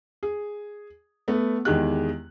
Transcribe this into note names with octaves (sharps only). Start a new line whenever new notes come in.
G#4
A3 B3
E2 D#3 G#3 G4 F#6